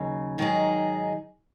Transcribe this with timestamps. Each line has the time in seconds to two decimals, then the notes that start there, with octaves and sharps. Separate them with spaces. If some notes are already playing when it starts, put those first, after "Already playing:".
Already playing: D#2 C#3 F#3
0.38 G#2 D#3 F#3 D#4 G#4